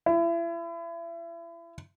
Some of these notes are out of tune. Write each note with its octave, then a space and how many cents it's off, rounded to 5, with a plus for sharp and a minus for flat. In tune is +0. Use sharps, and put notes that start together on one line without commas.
E4 +35